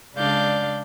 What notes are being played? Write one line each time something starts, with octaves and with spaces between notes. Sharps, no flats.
C#3 G#3 D4 D5 F5 G6